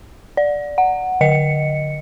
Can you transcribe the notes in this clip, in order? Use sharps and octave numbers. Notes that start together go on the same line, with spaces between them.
D5
F#5
D3 D#5 C#7